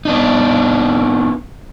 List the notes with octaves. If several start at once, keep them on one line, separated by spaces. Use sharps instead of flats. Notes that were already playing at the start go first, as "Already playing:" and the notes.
B3 D4 D#4